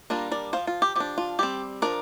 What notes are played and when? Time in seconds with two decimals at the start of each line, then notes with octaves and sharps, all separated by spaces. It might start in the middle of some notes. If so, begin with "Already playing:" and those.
0.10 G3 A#3 D4 F4 A#4
0.32 A#4 D5
0.53 C4 C5 F5
0.57 F3
0.67 F4
0.82 G4
0.96 F3 D4 G4
1.18 F4
1.39 G3 C4 G4
1.82 F3 D4 A#4 D5